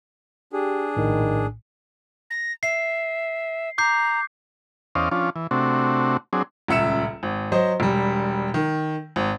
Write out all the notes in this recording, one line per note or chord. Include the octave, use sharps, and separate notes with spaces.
D4 G4 G#4
A#1 A2 D#3
A#6
E5 C7
A#5 D6 G6 C7
E2 C#4 C5 D5 D#5 F5
F3 C#4 D4 F4
E3
C3 A3 C4 D4 F#4
F#3 C4 D4 G#4
D#1 C#2 E5 C#7 E7
G#1
F#3 C5 D#5
E1 G3
D#3
G#1